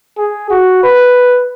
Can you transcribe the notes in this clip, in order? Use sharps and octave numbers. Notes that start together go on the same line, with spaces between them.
G#4
F#4
B4